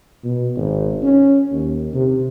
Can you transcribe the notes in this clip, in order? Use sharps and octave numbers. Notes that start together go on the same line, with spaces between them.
B2
G#1
C#4
D#2
C3